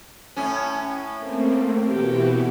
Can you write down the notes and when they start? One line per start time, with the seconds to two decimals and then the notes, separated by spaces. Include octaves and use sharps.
0.37 A2 C#4
1.18 A3 A#3 C4
1.86 B2 E3 F#4 G4